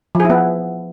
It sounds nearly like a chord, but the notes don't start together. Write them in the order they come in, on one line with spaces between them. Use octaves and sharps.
F3 G#4 E4 B3